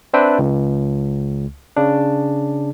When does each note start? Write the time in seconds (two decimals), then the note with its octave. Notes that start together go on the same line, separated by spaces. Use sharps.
0.14 C4 D4 B4 C5 E5 G5
0.39 C#2
1.76 C#3 D4